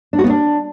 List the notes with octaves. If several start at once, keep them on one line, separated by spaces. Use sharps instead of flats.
D4
F#4
B3
D4